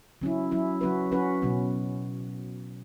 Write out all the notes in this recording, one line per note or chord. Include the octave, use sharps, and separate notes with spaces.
F#3 C#4 E4
F#3 C#4 E4
F#3 C#4 F#4 B4
F#3 C#4 F#4 B4
B2 F#3 C#4